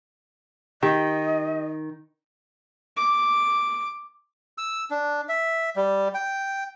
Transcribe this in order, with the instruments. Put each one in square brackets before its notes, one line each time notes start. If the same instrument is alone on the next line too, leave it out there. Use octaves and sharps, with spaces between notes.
[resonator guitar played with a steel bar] D#3 [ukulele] G4 [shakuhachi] D#5
[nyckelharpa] D6
[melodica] E6
D4
E5
G3
G5